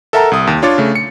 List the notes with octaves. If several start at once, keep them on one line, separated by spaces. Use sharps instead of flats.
A4 A#4 E5 F#5 A5 A#5
C2 D#6
D#2
D4 F4 C#5 D6 A6
C#3 A3
C#7